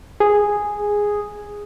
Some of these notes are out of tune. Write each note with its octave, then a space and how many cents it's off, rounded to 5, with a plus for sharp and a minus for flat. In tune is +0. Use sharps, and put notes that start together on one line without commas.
G#4 -5